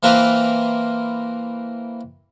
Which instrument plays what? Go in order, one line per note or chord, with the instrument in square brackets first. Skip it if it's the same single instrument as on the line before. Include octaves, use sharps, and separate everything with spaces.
[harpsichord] E3 A#3 C4 A#4 B4